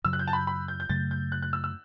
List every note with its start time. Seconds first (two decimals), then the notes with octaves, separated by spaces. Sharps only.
0.05 F#2 C#3 F#3 E6
0.13 F#6
0.19 G6
0.27 A5
0.33 B5
0.47 B5
0.68 G6
0.80 G6
0.89 F#2 C#3 F#3 A3 A6
1.11 G6
1.32 F#6
1.42 F#6
1.53 E6
1.64 E6